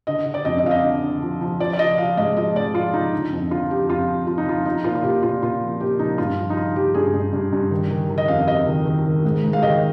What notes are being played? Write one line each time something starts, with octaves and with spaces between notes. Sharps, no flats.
D3 D#5
D3
D5
F2 D#5
D#5
F2 F5
D#5
D3
D3
F3
F3
F3 D5
D5
F3 D#5
F3 F5
G#2 D#5
F3 D#5
G#2 D5
F3 F4
F3 D#4
D3
F2
D3 F4
F3 G4
F2 F4
F3
F3 F4
D#4
F3 F4
F3 D#4
A#2 F4
F4
A#2 G4
A#2 F4
A#2 F4
F3
A#2 G4
F3 D#4
G2 F4
F3
D#4
F3 F4
F3 G4
G2 G#4
G2
G2
G2
D#3
D#3
D#3
D#5
F2 F5
F2 D#5
D#3
D#3
D#3
G#2
G#2
F5
D#3 D#5